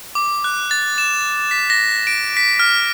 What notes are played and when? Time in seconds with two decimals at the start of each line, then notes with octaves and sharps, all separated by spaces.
0.15 D6
0.44 F#6
0.71 A6
0.98 E7
1.51 B6
1.70 A#6
2.07 D7
2.37 B6
2.59 F6